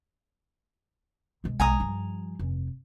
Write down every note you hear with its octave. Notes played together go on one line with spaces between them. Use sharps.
B1 G#3
B1 G#3 G#5 A#5 D#6
G2 F3
F1